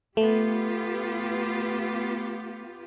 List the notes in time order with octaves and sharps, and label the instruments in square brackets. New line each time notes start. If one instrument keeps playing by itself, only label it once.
[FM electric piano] A3 [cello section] B3 F4 G4